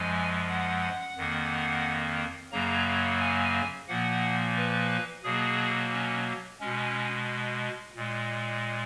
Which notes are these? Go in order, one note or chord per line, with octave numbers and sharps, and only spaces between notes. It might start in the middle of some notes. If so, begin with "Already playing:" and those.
Already playing: F#2 F3 G#3 G#5
F#5
F2 D#3 A#3
F#2 C#3 F#3 A#3 A#5
G#5
A#2 F3 A#3 F#5
B4
B2 F#3 A#3 G#4
C#4
B2 G#3 C#4
A#2 G#3